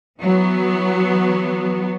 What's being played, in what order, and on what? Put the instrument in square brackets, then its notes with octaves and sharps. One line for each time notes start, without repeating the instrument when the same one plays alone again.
[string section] E3 F#3 B3